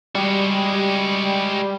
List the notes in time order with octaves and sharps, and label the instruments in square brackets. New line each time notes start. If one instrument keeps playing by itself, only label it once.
[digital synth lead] G3 [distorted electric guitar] G#3 F#4